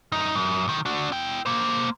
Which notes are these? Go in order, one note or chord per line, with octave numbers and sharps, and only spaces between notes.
F#2 D#4
F#2
B1 D#3
D4 F#4
E4 G5
A#3 C5